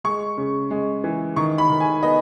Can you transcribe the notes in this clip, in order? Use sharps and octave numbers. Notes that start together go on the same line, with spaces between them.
G#3 C#6
C#3
G#3
E3
D#3 C#6
B5
D#3
G#5
B3 D#5